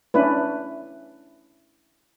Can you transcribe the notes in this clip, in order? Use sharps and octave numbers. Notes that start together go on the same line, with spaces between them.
C#4 D4 E4 B4